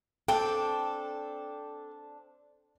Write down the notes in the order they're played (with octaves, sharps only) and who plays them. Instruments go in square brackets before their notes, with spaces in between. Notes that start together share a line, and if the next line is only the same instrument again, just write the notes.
[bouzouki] C4 D4 [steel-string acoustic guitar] A4 [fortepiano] G5